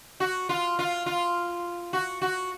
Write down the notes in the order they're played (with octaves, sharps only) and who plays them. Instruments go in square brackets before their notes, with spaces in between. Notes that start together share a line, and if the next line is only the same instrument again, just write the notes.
[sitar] F#4
F4
F4
F4
F#4
F#4